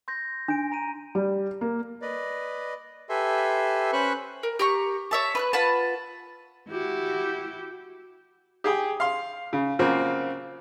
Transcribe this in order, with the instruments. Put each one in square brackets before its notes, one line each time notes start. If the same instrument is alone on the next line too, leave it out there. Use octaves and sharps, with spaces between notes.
[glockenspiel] C6 G6 A#6
[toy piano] D4 [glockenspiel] G#5 D7
[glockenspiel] A#5 D7 D#7
[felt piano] G3
A#3
[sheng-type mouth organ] B4 D5 D#5
G4 A4 B4 E5 G#5 C6
C#4 B4 C5 B5 C#6 F#6
[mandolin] A#4
G4 A#5 C#6
C#5 E5 A5
B4 F6 F#6
F4 B4 F#5 A5
[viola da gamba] E4 F#4 G4
[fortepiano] G4 G#4 G5
F5 C6
C#3
C#3 F3 F#3 A#3 C4